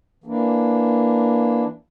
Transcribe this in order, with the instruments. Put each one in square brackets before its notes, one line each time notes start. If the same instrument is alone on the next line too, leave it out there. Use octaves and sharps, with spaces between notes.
[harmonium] E3 A#3 D4